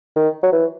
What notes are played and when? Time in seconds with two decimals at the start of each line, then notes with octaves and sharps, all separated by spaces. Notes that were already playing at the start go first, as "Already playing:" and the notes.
0.16 D#3
0.43 F#3
0.53 E3